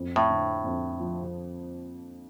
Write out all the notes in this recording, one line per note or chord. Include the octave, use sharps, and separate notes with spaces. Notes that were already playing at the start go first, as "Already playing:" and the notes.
Already playing: F2
A2
D3
F2
F3